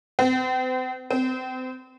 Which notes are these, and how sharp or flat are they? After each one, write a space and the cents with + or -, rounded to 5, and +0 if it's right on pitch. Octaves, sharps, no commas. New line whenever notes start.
C4 -40
C4 -35